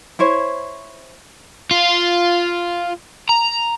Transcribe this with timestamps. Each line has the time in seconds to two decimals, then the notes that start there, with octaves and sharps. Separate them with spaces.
0.19 E4 C5 C#5
1.71 F4
3.29 A#5